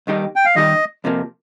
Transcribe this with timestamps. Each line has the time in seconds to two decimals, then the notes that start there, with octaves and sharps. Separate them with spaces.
0.07 D#2 D#3 G3 D#4 G4
0.36 G5
0.45 F5
0.55 D#2 D#3 G3 D#4 G4 D#5
1.04 F2 C3 F3 A#3